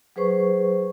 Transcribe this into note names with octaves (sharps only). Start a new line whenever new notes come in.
F#3 G#4 B4 C5 C#6